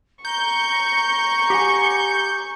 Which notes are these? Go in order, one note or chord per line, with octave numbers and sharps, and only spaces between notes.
A#5 C#6 G6
G4 F#5 G#5